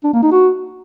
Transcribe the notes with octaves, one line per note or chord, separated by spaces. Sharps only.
D4
A#3
D#4
F#4